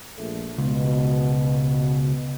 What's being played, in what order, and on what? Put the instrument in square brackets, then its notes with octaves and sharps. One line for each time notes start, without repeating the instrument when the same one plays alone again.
[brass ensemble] A#1 A3
[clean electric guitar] C#2 [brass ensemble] B2